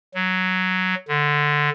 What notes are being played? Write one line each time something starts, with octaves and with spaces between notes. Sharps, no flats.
F#3
D3